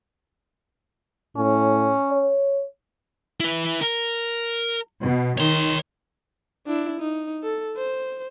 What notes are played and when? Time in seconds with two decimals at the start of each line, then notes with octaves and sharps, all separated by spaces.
1.36 A2 C#4
2.11 C#5
3.40 E4 B4
3.81 A#4
5.01 B2
5.38 D#3 C#5 C6
6.66 D4 E4
7.00 D#4
7.43 A4
7.77 C5